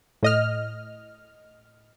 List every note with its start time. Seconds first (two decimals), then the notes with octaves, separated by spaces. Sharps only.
0.23 A2 D#5 F6